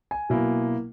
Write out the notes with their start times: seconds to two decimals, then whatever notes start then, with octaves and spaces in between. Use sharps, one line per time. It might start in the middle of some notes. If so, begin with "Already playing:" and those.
0.11 G#5
0.29 B2 F#3 A#3 E4